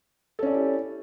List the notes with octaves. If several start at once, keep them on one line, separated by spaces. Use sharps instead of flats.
C#4 E4 G4 A4 D5